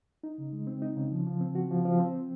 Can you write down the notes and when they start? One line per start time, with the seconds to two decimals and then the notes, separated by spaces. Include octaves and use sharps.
0.23 D#4
0.38 C#3
0.52 G#3
0.67 C4
0.82 D#4
0.96 C#3
1.11 F3
1.26 F3
1.41 C4
1.55 F#4
1.71 F3
1.85 F3
2.00 C4